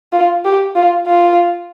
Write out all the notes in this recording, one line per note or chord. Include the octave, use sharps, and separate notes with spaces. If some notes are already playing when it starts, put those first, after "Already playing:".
F4
G4
F4
F4